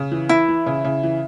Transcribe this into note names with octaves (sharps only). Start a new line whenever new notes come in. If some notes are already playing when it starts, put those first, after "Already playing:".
Already playing: C#3
E3
E3 E4
E3
C#3
C#3
E3